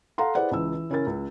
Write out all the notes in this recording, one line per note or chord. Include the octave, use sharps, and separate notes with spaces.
A4 F5 F#5 A#5 C6
E4 G#4 B4 C5 D5 F#5
C#2 E3 E6
E3
C#3 C#4 E4 A#4 A6
C#2